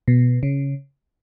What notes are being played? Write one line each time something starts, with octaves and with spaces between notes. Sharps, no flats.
B2
C#3